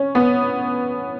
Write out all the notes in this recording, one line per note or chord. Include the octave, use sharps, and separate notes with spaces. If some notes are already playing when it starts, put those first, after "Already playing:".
Already playing: C#4
B3